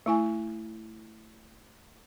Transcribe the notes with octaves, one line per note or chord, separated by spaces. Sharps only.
A3 E4 G#5